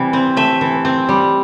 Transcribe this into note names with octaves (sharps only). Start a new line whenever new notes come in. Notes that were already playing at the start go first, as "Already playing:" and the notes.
Already playing: C3 E3 G3
C4
A3 E5
E3
C4
G3